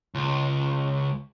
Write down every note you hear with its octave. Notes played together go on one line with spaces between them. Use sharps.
C#2